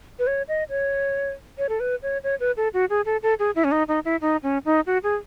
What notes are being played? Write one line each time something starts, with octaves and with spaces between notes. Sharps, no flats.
B4
C#5
D#5
C#5
C#5
A4
B4
C#5
C#5
B4
A4
F#4
G#4
A4
A4
G#4
E4
C#4
D#4
D#4
E4
D#4
C#4
D#4
F#4
G#4